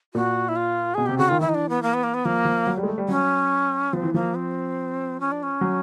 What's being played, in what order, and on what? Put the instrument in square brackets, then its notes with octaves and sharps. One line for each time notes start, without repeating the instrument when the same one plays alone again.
[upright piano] A#2 [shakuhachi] F#4
[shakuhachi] E4
F4
[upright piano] B2 [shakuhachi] G#4
[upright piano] C3 [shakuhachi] G4
[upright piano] C#3 [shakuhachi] F#4
[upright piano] D#3 [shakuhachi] F4
[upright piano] E3 [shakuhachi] E4
[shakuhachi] D#4
D4
B3
A#3
B3
A#3
B3
[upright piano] F3 [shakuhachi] A#3
[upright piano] F3
F#3
G3
G#3
A3
G3
[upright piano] F#3 [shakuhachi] C#4
[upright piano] F3 [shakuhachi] C4
[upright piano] E3
[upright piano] F3 [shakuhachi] A#3
[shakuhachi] C4
C#4
D4
C#4
[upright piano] F#3